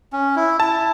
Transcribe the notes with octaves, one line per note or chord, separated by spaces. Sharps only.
C#4
E4
E4 A5